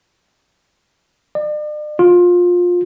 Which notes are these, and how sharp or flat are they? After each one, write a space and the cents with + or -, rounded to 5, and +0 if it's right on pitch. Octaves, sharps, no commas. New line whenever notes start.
D5 +40
F4 +20